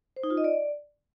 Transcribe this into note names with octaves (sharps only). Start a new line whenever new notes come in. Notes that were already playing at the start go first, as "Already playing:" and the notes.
C5
D#4
F4
D#5
D5